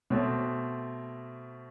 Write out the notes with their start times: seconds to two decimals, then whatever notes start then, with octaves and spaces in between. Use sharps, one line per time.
0.10 B2 A3 C4